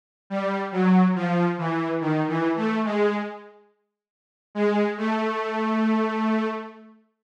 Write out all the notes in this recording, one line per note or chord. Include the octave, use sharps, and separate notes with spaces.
G3
F#3
F3
E3
D#3
E3
A3
G#3
G#3
A3